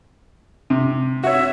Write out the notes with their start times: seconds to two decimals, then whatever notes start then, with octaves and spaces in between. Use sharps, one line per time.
0.70 C3
1.24 F#4 C#5 E5